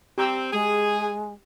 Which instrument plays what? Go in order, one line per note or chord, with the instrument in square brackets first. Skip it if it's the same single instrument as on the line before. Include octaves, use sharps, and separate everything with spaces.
[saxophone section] C4 [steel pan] G4 A#5 E6
[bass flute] G#3 [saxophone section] G#4